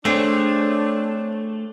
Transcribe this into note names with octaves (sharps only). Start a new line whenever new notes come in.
A3 C4 D4 G#4 C#5